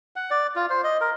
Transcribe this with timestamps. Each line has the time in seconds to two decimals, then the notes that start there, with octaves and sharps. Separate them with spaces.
0.16 F#5
0.31 D5
0.56 F4
0.70 C5
0.84 D#5
1.01 A#4